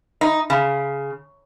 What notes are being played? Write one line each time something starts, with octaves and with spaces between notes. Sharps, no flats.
D#4
C#3